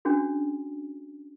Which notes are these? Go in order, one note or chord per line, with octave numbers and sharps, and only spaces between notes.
C#4 D4 F#4 G#4